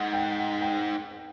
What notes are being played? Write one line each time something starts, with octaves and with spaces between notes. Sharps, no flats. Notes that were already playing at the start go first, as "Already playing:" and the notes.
Already playing: G#2 F#5
G5
F#5
G5